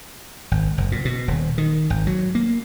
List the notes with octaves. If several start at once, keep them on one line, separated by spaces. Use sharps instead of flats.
G#1
F#1
A#2
B2
D#1
D#3
G#1
F#3
A#3